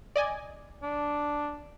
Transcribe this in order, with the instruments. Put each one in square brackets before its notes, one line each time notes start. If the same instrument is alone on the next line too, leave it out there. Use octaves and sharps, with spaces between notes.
[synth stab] D5 D#5 G#5
[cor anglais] D4